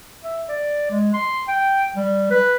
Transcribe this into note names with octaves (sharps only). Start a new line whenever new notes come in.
E5
D5
G#3
C6
G5
G3
B4